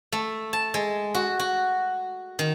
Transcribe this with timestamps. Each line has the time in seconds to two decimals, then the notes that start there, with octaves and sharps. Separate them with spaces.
0.12 A3
0.53 A5
0.74 G#3
1.15 F#4
1.40 F#4
2.39 D#3